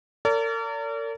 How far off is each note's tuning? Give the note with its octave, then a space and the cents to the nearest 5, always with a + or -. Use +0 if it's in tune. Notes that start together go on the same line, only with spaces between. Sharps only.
A#4 -40 D5 -40